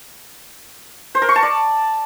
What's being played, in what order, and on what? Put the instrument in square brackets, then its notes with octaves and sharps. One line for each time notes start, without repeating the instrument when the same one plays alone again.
[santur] C5
A#4
C#6
A5
D5